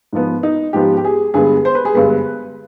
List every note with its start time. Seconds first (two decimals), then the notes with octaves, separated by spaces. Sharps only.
0.13 G#2 F3 B3
0.43 D#4
0.73 G#2 F3 B3 G4
0.97 G4
1.04 G#4
1.34 G2 D3 G#3 B3 G#4
1.65 C5
1.75 B4
1.85 G#4
1.95 G2 D3 G#3 B3 B4